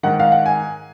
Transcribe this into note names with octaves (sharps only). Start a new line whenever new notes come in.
G#2 D#3 F#5
F5
F#5
G#5